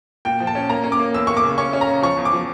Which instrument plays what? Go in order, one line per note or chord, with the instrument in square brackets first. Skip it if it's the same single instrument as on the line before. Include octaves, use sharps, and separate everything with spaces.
[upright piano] A#2 G5
F3
A5
C#4
A#3 A#5
C#4
D6
A#3
E2 E6
A#3 C#6
D6
C#3
C#4 C#6
C#4
A#5
C#3
F3 C#6
E2
D6
F3